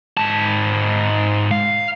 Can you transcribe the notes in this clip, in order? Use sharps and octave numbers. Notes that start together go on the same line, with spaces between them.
G#2 A5
F5